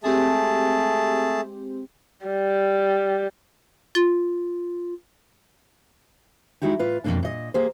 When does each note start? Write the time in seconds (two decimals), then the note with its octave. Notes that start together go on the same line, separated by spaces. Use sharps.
0.04 G#3 A3 C4 G4 G#4 A5
2.26 G3
3.95 F4
6.62 G#3 D#4 E4 F#4 G4
6.79 A2 F4 B4
7.04 F2 G#2 B2 A#3 D4
7.23 A#2 D#5
7.54 A#3 G4 G#4 C5